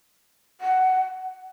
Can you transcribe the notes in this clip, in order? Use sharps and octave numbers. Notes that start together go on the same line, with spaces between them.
F#5